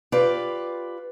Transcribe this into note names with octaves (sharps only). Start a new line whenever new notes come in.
F4 G4 B4 D5